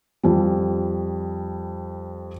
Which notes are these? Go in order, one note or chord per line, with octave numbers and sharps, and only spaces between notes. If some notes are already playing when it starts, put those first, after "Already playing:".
F2 G3